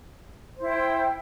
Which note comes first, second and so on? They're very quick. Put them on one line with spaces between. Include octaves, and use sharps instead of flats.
C5 E4 G5